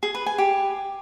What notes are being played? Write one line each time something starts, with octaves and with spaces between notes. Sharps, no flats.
G#4
B4
G#5
G4